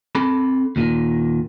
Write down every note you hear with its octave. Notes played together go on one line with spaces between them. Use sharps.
C4 A4 B5
D#2 A#2 D3 D#3